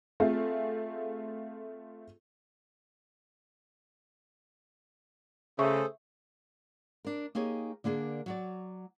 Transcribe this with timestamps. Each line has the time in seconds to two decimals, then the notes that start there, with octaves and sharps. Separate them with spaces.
0.20 A3 C4 F4 G#4
5.59 C#3 A3 G#4 A4 C5 E5 C#6
7.05 D4 A#4
7.35 A#3 D#4 G4 G#4 C#5
7.84 D3 A#3 D4 G#4 A#4
8.26 F#3 F#4 D5